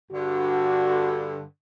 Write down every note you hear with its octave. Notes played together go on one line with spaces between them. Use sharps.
G2 D3 F#4